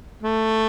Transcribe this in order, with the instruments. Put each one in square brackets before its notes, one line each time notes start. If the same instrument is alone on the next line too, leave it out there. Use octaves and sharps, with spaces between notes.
[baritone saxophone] A3